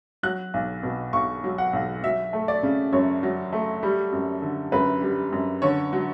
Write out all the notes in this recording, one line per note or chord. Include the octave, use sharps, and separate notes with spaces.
F#3 F#6
B1
B2
B1 C#6
F#3
F#5
B1
F#3 E5
A3
D5
C#3
F#2 C#5
F#3
A3
G3
F#2
D3
F#2 B4
G3
F#2
D3 C#5
F#3